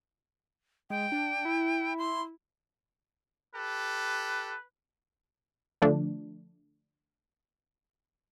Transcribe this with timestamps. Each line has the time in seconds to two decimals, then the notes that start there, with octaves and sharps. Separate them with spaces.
0.90 G#3 G5
1.12 D4
1.45 E4
1.98 C6
3.54 G4 A4 B4
5.82 D3 F3 A3 D4